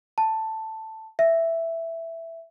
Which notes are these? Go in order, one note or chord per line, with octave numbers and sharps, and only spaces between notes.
A5
E5